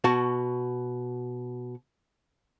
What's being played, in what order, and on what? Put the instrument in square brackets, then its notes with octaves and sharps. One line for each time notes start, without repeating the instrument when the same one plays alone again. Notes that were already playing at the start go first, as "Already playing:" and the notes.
[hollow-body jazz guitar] B2 F#4 A5